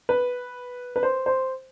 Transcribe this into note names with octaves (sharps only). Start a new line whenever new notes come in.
B4
B4
C5
C5